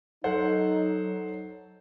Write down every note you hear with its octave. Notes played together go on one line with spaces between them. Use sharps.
F#3 D#4 A4 C5 F#5